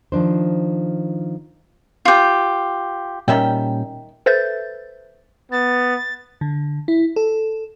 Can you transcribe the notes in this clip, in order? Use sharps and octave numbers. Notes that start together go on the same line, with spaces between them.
D#3 F3 D4 C5
F4 G4
A#2 D#3 G3 C#4 E5 G5
A4 B4 C5 E5 G6 A6
B3 A6
D3
E4
A4